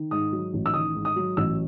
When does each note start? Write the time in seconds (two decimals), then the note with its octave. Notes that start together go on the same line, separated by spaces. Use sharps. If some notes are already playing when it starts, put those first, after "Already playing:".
Already playing: D#3
0.11 G#2 D#6
0.32 F#3
0.53 A1
0.66 E6
0.74 D#3 D#6
0.95 G#2
1.05 D#6
1.16 F#3
1.37 A1 E6